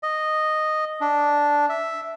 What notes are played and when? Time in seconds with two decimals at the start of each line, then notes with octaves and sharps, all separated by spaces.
0.03 D#5
1.01 D4
1.69 E5